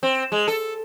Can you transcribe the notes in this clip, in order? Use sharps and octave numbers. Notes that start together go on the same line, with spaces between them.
C4
G#3
A4